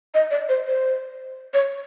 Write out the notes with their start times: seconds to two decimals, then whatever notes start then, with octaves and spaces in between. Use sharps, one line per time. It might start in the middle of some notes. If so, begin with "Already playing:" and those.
0.14 D#5
0.31 D5
0.49 C5
0.66 C5
1.54 C#5